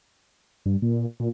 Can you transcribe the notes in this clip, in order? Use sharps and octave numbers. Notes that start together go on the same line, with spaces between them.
G2
A#2
A#2